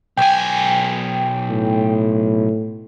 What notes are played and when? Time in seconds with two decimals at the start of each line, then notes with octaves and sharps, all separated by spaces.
0.17 B1 G5 G#5
1.49 A2